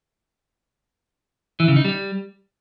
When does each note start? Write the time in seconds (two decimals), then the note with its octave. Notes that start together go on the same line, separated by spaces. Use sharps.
1.60 E3
1.68 C#3
1.76 D#4
1.85 G3